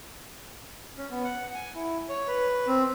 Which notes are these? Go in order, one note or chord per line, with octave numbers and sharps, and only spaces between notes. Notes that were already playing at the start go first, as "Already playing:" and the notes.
C#4
B3
F#5
G#5
E4
C#5
B4
C4